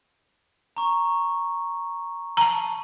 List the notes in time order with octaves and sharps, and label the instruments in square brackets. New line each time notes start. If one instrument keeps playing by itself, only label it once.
[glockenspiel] A#5 C#6
[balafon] A5 A#5 [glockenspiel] D#7